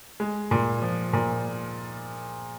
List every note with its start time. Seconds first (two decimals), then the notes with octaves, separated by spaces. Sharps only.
0.20 G#3
0.51 A#2
0.82 F3
1.13 A#2